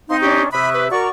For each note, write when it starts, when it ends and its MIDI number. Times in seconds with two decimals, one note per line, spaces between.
0.10 0.44 60
0.10 0.44 63
0.10 0.17 77
0.10 0.17 84
0.21 0.51 61
0.21 0.51 62
0.21 0.42 67
0.21 0.51 85
0.52 0.88 48
0.52 0.88 76
0.52 0.69 83
0.52 0.83 85
0.52 0.83 87
0.52 0.83 90
0.74 0.88 71
0.91 1.10 66
0.91 1.07 70
0.91 1.10 74
0.91 1.10 85